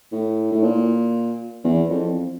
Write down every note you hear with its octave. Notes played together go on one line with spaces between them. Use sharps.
A2
A2
A#2
E2
F2